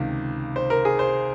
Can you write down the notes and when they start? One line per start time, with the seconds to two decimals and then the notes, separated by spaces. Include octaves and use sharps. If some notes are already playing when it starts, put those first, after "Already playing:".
Already playing: C#2 C3 D#3 F5
0.56 C5
0.70 A#4
0.85 G#4
0.99 C5